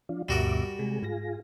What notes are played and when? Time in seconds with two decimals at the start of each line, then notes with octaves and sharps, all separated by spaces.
0.09 F3 D4 F4
0.29 D2 G2 B2 G3 F#4 A#4 E5 D6
0.79 C3 G#3 G#4
1.02 G#2 F4 G#4 A#6